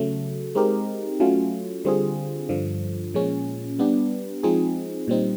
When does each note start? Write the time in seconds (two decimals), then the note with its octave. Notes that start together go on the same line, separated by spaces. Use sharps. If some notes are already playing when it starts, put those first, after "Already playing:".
Already playing: C#3 F#3 A3
0.55 G#3 C4 D#4 G4 A#4
1.20 F#3 A3 C#4 F4
1.85 D3 G3 C4 F4 G#4
2.49 G2 D3 F3
3.14 A#2 F3 G#3 C#4
3.79 G3 B3 D4 G4
4.43 F3 G#3 C4 D#4 G#4
5.08 A#2 G3 C4 D#4